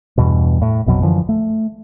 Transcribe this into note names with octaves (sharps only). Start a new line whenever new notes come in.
E2 G2 B2
A2
A#1 F2 B2 F#3
F#2 D3 E3 F3
A3